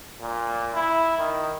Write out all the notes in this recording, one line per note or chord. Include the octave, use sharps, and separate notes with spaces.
A#2
E4
D#3